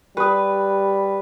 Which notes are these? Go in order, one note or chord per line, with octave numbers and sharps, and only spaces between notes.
G3 G4 B4 D#6